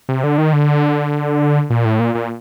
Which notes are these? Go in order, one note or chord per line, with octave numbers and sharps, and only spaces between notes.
C3
D3
D#3
D3
A#2
A2
A#2
A#2